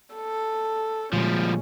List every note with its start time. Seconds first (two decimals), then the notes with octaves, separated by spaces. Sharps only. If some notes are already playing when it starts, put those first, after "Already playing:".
0.15 A4
1.13 A#2 D3 F3 G3 G#3 C#4